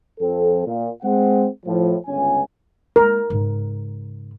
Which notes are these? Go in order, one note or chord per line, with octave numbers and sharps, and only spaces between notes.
F2 F3 C4 A4
A#2
G#3 C4 F#5
A2 F3
G1 C#2 C#4 G#5
G#3 A#3 A#4
G#2 C#3